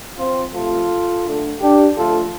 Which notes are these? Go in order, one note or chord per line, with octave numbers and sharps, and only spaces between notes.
C4 F4
C3 F3 A3 F4 A4
D3 A3
D4 G4
D3 F3 A3 F4 A4